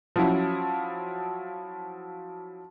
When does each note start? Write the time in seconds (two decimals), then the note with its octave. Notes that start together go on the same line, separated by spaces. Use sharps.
0.16 F3 F#3 C#4 E4